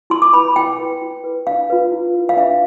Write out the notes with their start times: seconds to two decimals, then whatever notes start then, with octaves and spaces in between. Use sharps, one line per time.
0.10 E4 C6
0.22 D6
0.33 B4 B5
0.56 E4 G5
0.79 B4
1.02 E4
1.24 B4
1.47 D4 F5
1.70 F4 B4
1.92 E4
2.15 B4
2.29 F5
2.37 D4 E5